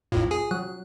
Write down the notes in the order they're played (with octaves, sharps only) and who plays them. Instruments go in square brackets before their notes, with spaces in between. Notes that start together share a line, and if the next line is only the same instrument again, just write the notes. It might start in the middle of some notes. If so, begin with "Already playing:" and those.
[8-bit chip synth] B1 F2 A2 [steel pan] F4
[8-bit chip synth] G#4 G#5
[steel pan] F#3 [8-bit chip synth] F#6